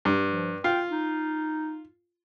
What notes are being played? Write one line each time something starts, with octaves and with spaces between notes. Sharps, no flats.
G2
F3
F4 G5
D#4